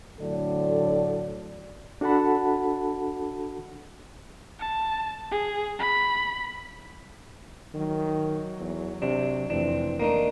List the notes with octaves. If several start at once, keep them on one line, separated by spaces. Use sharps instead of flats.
A2 D3 F#3 A4 D5
D4 F#4 A4 F#5 A5 B5
A5
G#4
B5
D#3 F#3
E2
C3 D4
F1 E3 C4 D4
A3 A#3 D4 D#4